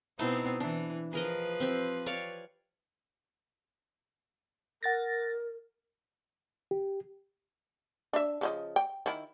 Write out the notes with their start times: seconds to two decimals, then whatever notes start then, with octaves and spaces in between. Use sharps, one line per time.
0.19 B2 B3 C4 D#4 E4 A5
0.60 E3 D4
1.13 F3 G#4 A#4 B4 D#5
1.60 C4 G4
2.06 C#5 D5 F5
4.83 A#4 F#5 A6 A#6
6.71 G4
8.13 D4 E5
8.41 C#3 F3 D#5
8.76 G5
9.06 D#3 E4